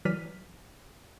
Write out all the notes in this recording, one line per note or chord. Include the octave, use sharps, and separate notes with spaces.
E3 F#3 D5 F6 B6 D#7